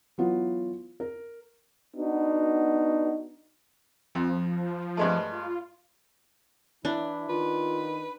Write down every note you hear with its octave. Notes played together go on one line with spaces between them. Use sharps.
E3 F#3 B3 F4
A#4
B3 D4 D#4 F#4
F2 F3
G2 G#3 A3
F4
E3 D4 E4
D#3 F4 B4